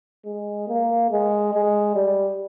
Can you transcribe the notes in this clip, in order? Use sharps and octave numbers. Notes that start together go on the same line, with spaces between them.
G#3
A#3
G#3
G#3
G3